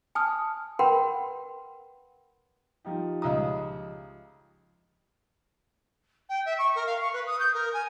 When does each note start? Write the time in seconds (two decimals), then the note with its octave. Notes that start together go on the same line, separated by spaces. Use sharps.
0.15 G#5 A5 D#6 F6
0.79 A#4 B4 F#5 G5 B5 C6
2.85 F3 D#4 G4
3.22 C#2 D#5 E5 A#5 D#6
6.29 G5
6.45 E5
6.58 C#6
6.75 A#4
6.86 F5
7.01 C#6
7.13 B4
7.26 D#6
7.39 G6
7.54 A#4
7.73 G#5